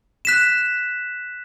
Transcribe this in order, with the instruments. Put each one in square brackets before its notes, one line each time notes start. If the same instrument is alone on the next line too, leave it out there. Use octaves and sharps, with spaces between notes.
[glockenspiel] F#6 B6 E7